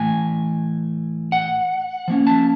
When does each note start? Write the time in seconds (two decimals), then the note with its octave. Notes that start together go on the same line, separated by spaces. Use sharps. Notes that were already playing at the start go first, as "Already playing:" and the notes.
Already playing: A2 E3 A3 G#5
1.32 F#5
2.08 F3 A#3 C#4
2.27 A5